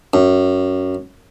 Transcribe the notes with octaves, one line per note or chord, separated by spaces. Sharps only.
F#2